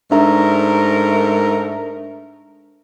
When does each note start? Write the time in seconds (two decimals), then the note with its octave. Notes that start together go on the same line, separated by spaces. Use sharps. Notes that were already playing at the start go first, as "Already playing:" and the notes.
0.12 G#2 A3 D4 A#4 E5 A#5